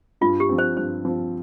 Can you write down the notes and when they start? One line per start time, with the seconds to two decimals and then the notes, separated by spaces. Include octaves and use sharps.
0.21 G2 F4
0.40 G4
0.49 F3 C4
0.58 C5
0.77 G2 C5
1.05 F3 C4